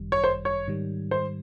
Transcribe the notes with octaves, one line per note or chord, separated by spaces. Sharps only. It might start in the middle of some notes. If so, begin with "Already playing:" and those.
Already playing: G1 F#2 D#3 G3
C#5
C5
C#5
G#2 D#3 G3
C5